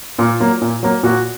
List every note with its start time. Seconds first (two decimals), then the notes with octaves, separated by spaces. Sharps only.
0.19 A#2 F4
0.40 F#3 A#3
0.61 A#2
0.83 F#3 A#3
1.03 A#2 F#4